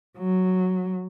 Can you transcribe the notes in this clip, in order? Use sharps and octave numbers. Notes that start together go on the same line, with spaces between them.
F#3